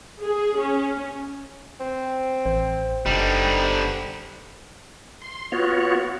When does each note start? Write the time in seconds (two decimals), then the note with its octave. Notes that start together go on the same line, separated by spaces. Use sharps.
0.23 G#4
0.58 C#4
1.80 C4
2.46 A1 C5
3.06 F#1 D3 G3 D#4
5.22 C6
5.52 B3 F4 F#4 C#5